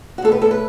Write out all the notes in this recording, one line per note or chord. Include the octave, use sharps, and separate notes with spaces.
F#4
A2 A4
B4
A2 A4
B4